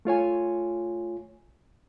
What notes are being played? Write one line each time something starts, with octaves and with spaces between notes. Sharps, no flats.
A3 F4 C#5 G#5